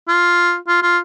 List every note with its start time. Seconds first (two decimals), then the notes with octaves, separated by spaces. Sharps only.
0.08 F4
0.68 F4
0.82 F4